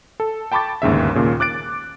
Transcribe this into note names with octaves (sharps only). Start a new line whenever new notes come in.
A4
G5 A5 B5 C#6 D6 A6
G1 D#2 G#2 C#3 E5
D#2 A#2 C#3
D6 F#6 A6 D7